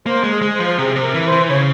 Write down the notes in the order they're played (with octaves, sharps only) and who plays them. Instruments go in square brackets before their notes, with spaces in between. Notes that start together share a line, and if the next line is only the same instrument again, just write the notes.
[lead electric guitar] A#3 [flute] C5
[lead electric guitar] G#3
[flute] G#4
[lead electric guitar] G#3
[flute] C5
[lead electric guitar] F3
[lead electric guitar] C3 [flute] G#4
[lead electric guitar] C3
[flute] A#4
[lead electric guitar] E3
[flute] C5
[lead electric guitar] E3
[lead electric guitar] C#3 [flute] C#5